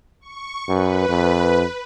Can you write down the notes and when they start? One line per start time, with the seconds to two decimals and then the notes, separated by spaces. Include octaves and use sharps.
0.21 C#6
0.69 F#2 B4
1.09 F2